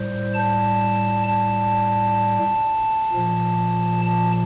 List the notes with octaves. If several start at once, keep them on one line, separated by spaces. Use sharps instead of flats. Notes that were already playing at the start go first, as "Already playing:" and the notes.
Already playing: A2 G3 C5
A5
A5
A#2 F3
A5